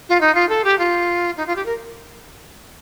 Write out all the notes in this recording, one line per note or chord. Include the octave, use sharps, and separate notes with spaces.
F4
D#4
F4
A4
G4
F4
D#4
F4
G4
A#4